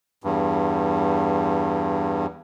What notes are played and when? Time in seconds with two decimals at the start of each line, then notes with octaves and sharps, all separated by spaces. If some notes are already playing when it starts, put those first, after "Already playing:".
0.24 E2 G2